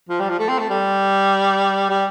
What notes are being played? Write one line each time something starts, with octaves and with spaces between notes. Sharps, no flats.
F3
G3
F3
A3
C4
A3
G3
G3